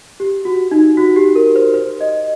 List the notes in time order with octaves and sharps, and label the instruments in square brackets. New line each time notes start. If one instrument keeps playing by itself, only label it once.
[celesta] G4
F#4
D#4
F#4
G4
A#4
C5
C5
D#5